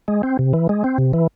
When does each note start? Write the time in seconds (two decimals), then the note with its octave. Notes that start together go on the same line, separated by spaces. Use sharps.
0.08 G#3
0.23 C4
0.39 C3
0.53 E3
0.69 G#3
0.84 C4
0.98 C3
1.13 E3